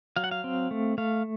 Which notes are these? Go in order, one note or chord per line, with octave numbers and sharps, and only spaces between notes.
F#3 F5
F#5
F5
C4
A3
A3 F5